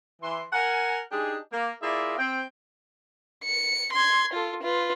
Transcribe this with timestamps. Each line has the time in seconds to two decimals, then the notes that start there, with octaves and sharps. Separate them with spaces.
0.23 E3 C6
0.53 A#4 F#5 G#5
1.11 D4 D#4 G4 G#4
1.52 A#3
1.82 A#3 E4 F4 G#4 D5 E5
2.18 C4 G5
3.44 C#7
3.93 C6 G#6
4.33 F4 A4
4.63 F4 B4